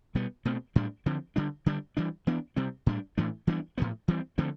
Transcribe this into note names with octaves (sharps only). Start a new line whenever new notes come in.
B2 G3 B3
B2 A3 C4
A2 G3 D4
D3 F3 C4
D3 G3 D4
D3 G3 D4
E3 G3 D4
E3 B3 D4
C3 G3 C4
A2 G3 D4
A2 E3 A3 D4
E3 G3 B3 D4
A2 F3 B3
E3 G3 C4
D3 F3 A3 C4